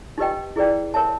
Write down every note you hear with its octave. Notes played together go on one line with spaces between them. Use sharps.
D#4 G4 B4 D#5 G5
E4 G#4 B4 D5 G5
A#4 C#5 E5 A5